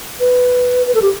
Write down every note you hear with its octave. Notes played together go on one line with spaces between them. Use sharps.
B4
B4
A4
G4